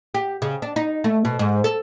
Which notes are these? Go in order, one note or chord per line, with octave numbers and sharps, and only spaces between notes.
G4
C#3
D4
D#4
A3
B2
G#2
A4